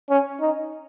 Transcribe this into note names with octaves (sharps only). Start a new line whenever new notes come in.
C#4
D#4